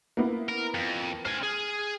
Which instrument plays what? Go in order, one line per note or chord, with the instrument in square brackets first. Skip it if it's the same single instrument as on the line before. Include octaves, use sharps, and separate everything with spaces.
[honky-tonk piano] A#3 B3 E4
[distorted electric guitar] A#4
F2
[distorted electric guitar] C5 G#5 [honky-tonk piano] F6
[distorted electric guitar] G#4